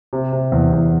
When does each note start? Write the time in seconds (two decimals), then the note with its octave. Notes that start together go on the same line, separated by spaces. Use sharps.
0.13 C3
0.32 C3
0.52 E2
0.72 E2